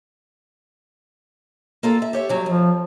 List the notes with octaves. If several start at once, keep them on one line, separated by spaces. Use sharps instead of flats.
A#3 F4 A4
E5
G4 C#5 E5
G2 F#3
F2 F3